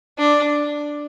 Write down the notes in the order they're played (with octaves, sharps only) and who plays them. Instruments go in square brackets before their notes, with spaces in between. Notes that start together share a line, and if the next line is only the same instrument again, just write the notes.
[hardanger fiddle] D4